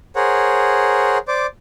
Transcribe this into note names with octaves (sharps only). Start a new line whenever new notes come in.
G#4 A#4 C5 C#5 F#5
C5 D5 D6